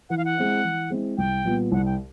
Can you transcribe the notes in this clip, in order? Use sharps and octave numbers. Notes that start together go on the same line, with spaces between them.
E3 F#5
F5
F#5
G#3 C4 E4
E3
G#3 C4 E4
C2 G5
A#2 G3 B3
C2 F#5
G5